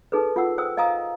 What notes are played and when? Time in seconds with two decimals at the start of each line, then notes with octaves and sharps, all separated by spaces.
0.12 D#4 G#4 A4 B4
0.36 F4 F#5 E6
0.58 C5 G5 D#6 E6
0.77 D#5 F5 G#5 A#5 D#6